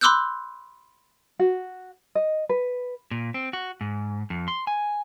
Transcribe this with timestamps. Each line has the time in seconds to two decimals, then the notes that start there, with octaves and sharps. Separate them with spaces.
0.01 B5 C6 D6 E6 F#6 G6
1.39 F#4
2.15 D#5
2.49 B4
3.11 A#2
3.34 C4
3.53 F#4
3.81 G#2
4.30 F2
4.48 C6
4.67 G#5